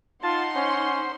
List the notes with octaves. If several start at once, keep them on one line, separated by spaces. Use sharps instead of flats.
D#4 F4 F#5 A5 C6
C#4 C5